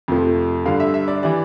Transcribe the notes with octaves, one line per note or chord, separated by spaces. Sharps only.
F2 C3 F3 A3
G2 D3 G3 F5
E5
E5
D5
E3 G3 D5